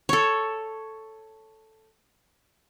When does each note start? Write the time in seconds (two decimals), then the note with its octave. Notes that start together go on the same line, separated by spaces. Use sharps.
0.09 A4 C#5